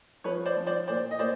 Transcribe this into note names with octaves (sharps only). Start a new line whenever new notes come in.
F3 B4 C#5
C5 D5
F3
C5 D5
A#2 C5 D5
D#5
A#2 C5 D5